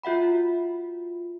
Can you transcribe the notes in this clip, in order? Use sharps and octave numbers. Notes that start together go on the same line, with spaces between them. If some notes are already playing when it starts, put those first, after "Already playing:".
F4 F#4 E5 F#5 B5